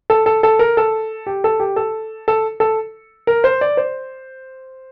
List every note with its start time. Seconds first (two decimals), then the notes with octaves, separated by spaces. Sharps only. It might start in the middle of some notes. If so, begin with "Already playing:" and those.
0.10 A4
0.26 A4
0.43 A4
0.59 A#4
0.77 A4
1.26 G4
1.44 A4
1.60 G4
1.76 A4
2.28 A4
2.60 A4
3.27 A#4
3.44 C5
3.61 D5
3.77 C5